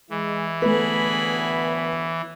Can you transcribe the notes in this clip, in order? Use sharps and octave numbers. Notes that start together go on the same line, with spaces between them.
E3 G#3
D2 A2 A3 B3 G#4 B4 B5